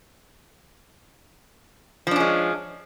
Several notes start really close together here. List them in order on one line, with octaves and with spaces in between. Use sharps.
F3 D4 C#4 G#3